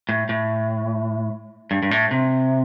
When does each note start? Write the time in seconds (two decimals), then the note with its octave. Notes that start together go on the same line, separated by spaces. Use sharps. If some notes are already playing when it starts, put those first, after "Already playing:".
0.09 A2
0.29 A2
1.71 G2
1.83 G2
1.91 A2
2.11 C3